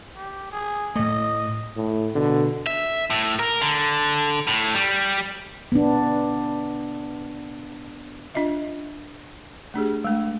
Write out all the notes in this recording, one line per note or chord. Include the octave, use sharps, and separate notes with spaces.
G4
G#4
A2 A3 D#5
A2
B2 D3
E5
A2
A#4
D3
A2
G3
B3 D4
D4 F4 D#5 E5
A3 D4 G4 G#4
G#3 A3 D4